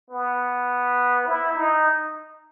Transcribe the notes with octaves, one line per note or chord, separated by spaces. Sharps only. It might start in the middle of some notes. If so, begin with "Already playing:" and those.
B3
E4
D#4